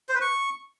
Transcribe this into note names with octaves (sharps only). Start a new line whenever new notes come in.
C5
B4
C#6